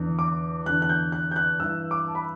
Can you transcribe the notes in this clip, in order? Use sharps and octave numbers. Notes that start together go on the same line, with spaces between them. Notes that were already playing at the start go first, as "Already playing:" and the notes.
Already playing: E2 D3
D6
E2 D3 F#6
F#6
G6
F#6
G6
F#6
G2 E3 E6
D6
A5
B5